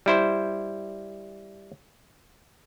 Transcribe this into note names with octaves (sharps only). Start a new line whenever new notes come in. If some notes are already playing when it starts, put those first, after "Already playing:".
G3 E4 C5